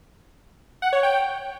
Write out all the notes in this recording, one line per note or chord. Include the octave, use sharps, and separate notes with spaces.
F#5
C#5
G5